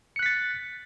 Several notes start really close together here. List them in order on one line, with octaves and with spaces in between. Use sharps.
C#7 F#6 B6 A6